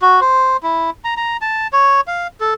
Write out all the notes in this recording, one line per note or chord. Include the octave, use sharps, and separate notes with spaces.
F#4
C5
E4
A#5
A#5
A5
C#5
F5
A4